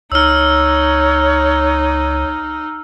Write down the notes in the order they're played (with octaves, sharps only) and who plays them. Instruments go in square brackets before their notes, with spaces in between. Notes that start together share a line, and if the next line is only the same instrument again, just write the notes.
[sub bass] C#2 [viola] D#4 [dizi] C#5 [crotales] E6 F6